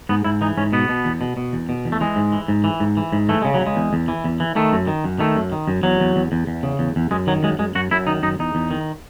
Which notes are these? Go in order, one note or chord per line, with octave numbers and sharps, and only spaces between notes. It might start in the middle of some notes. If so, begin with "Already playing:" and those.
G#2 B3
G#2 E4
E3 D#4
G#2 C#4
B2 B3
B2
E2
B2
B2
E2
B2
E2
A3
E3 G#3
G#2
E3
G#2
E3
G#2
E3
G#2
E3 A3
C#3 G#3
F#3
C#3
G#3
E2
E2
E3
E2
E3
D#3 A3
F#2
D#3
F#2
D#3 A3
F#2
D#3
F#2
E2 F#3
E2
E2
E2
E2
C#3
E2
E2
F#2 G#3
D#3 F#3
F#2 G#3
F#2 G#3
F#2 F#4
F#2 E4
D#3 D#4
F#2 D#4
E2 D#4
E2
D#3